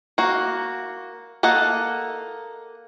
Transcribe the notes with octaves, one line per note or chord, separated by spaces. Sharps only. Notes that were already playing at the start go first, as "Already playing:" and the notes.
A#3 F#4
A#3 A4 D#5 F#5